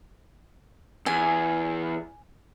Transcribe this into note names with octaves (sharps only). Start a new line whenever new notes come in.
E2 G#5